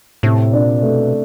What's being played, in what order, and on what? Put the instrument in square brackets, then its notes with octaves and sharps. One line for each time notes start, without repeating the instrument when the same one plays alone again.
[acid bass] A2 [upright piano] C3
[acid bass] A#2 [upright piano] D4
[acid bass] B2 [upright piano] A3